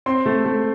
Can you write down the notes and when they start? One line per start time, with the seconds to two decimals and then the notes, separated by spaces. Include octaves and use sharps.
0.06 C4 C6
0.26 A3
0.45 A3